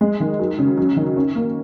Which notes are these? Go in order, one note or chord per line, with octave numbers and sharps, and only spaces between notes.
G#3
D#3
F#3
C#3
F#3
D#3
C#4
A#3